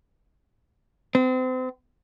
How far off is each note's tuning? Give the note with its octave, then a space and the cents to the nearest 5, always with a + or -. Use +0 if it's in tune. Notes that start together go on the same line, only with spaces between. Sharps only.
C4 -35